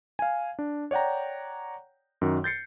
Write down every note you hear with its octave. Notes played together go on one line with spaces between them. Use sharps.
F5 G#5
D4
C#5 D5 F#5 G5 A#5
F#2 D#3 F#4
G6 A6 C7 C#7